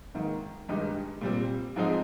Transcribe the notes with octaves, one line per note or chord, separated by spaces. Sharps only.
G#2 D#3 A#3
G2 D#3 G#3 D#4 G4
A#2 G3 C4
G#2 F3 G#3 C4 D#4